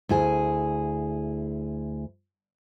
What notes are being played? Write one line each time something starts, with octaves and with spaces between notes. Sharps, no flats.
D2 E4 G#4